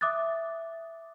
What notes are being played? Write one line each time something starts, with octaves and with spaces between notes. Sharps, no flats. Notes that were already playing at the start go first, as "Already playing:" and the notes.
E5 D6 D#6 F#6 A6